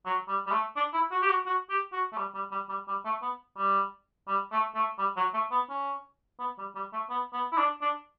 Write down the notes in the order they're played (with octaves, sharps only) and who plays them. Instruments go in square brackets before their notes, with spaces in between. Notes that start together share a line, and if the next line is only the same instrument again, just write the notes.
[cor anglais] F#3
G3
G3
A3
D4
E4
F#4
G4
F#4
F#4
G4
F#4
A3
G3
G3
G3
G3
G3
A3
B3
G3
G3
A3
A3
G3
F#3
A3
B3
C#4
B3
G3
G3
A3
B3
B3
E4
D4
D4